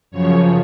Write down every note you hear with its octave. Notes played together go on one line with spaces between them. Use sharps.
F#2 C#3 F3 C#5